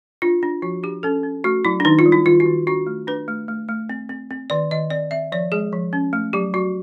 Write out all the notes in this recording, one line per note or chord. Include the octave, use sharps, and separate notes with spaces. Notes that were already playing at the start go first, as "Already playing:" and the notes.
D4 F4
D4
F3 F#4
D4 G4
C#4 A4
C#4
A3 F#4
F#3 E4
D4
D#3 D#4
F4
G3
E4
D#3 F4
F#4
D#3
D4 F#4
A3
D4 B4
A3
A3
A3
C4
C4
C4
D#3 D5
D#3 D#5
C4 D5
C4 E5
F3 D5
G#3 G#4
F3
C#4
A3
F#3 G4
F#3 F#4